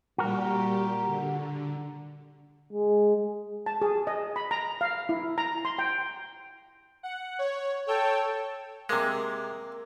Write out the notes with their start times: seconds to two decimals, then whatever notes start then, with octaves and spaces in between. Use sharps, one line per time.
0.18 A#2 G3 F#4 G4 A#4
1.05 D3
2.73 G#3
3.66 A5
3.81 G#4
4.07 D#5
4.36 B5
4.51 A#5
4.81 F5
5.09 E4
5.38 A#5
5.65 C6
5.79 G5
7.03 F#5
7.39 C#5
7.87 A4 C#5 G5 E6
8.89 C3 G#3 A#3